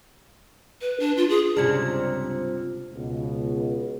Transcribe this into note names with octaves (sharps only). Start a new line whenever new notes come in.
B4
D4
F4
G#4
C#2 G2 C3 C#4 D4 F4 F6
C#2 B2